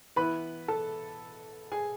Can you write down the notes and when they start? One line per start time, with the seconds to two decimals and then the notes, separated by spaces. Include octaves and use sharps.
0.16 E3 B3 E4 B4 B5
0.68 A4 A5
1.72 G#4 G#5